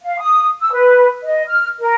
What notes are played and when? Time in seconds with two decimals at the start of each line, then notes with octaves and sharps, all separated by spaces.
0.01 F5
0.19 D#6
0.60 E6
0.72 B4
1.23 D#5
1.48 F6
1.80 A#4